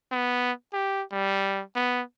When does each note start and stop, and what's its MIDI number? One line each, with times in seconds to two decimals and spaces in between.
0.12 0.52 59
0.73 1.02 67
1.12 1.62 55
1.76 2.01 59